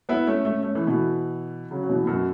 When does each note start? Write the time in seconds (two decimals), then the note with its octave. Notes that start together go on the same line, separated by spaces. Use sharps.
0.09 B3 E4
0.27 A3 C#4
0.45 A3 C#4
0.63 A3 C#4
0.75 E3 A3
0.87 B2 E3
1.71 C#3 F#3
1.83 F#3
1.89 B2 E3
2.03 A2
2.07 F#2 B2